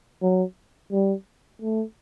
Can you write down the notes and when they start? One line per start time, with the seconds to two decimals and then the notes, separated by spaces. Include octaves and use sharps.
0.23 F#3
0.93 G3
1.62 A3